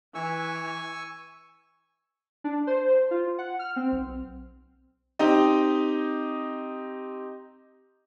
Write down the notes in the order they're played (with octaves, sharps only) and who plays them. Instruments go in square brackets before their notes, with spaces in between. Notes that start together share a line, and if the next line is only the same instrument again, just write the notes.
[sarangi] E3 [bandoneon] G#5 C#6 E6
[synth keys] D4
C5
F4
F#5
F6
C4
B1
[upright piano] C4 D#4 G4 D#5